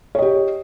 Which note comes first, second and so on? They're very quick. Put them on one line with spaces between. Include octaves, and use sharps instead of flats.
C#5 D#5 G4